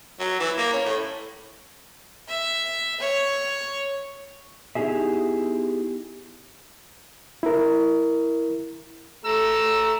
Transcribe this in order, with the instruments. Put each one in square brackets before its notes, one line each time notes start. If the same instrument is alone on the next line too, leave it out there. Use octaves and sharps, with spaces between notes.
[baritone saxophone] F#3
E3
A#3
C#4
A2
[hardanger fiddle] E5
C#5
[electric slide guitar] B3 D#4 E4 G4 G#4 E5
[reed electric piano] E4 A#4
[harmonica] A3 A#5 E6